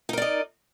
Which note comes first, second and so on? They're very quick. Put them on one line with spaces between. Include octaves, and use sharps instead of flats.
D#4 A#4 D5 D#5